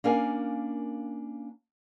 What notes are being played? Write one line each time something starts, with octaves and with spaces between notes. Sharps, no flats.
A#3 C#4 D4 A#4 F5 G#5